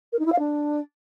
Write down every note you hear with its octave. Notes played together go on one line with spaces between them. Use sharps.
A#4
D#4
E4
F5
D4